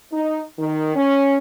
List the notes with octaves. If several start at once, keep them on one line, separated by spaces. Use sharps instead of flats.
D#4
D#3
C#4